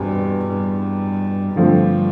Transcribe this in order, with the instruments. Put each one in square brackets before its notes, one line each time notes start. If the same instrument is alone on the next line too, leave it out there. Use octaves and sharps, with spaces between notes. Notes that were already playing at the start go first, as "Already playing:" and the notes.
Already playing: [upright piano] E2 B2 G3 C4 [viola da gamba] G2
[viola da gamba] G2
[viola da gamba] G2 [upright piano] D3 F3 A3 C4